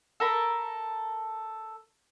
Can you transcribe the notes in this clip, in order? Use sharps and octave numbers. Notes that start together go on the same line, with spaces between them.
A4 A#4 B5